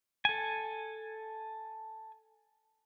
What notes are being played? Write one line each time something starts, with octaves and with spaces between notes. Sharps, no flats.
A4 G#5